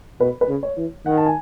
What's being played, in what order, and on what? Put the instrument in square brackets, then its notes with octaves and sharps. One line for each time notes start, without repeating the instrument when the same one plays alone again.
[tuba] B2 [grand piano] B4
[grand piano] B4
[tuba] C#3
[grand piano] C#5
[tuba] E3
[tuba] D#3 [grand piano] F#5
[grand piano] A5
G#5